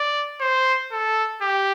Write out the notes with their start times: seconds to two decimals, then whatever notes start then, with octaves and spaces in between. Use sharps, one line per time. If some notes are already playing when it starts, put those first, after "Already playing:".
Already playing: D5
0.41 C5
0.92 A4
1.41 G4